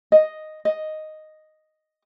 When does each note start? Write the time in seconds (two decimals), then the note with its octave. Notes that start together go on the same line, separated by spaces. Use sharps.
0.12 D#5
0.65 D#5